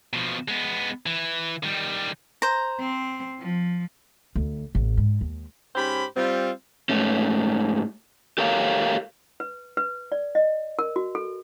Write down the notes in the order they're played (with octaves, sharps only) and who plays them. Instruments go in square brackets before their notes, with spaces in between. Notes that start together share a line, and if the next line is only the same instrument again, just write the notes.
[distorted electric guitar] B2 F3
G#3 B3
E3
D#3 G3
[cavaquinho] C5 A#5
[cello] C4
F3
[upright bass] D2
A1
G#2
D#2
[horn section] G#2 C#4 G4 C5 B5
G3 C4 F4
[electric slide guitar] G#2 A3 C#4
G4 A4 A#4 C#5 F5
[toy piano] B4
B4
D5
D#5
A#4
F#4
A4